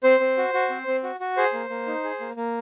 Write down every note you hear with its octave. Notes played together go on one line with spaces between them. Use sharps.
C4 C5
C4
F#4
F#4
C4
C4
F#4
F#4
G#4 C5
A#3
A#3
D#4
G#4
A#3
A#3